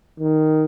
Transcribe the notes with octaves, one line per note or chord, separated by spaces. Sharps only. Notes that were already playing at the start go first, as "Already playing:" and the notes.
D#3